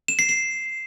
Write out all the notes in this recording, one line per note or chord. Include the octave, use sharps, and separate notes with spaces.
E7
C7
C7